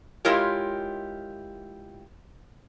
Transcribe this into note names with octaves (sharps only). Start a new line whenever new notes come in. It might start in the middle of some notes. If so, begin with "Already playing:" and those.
G#3 E4 F4 G4 A#4 C#5